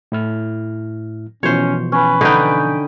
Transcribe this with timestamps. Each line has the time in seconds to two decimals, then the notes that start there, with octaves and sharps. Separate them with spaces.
0.12 A2 E4 F6
1.43 B2 E3 F3 C#4 C5 C#5
1.92 C#4 B4
2.21 D3 D#4 G5 B5 D#6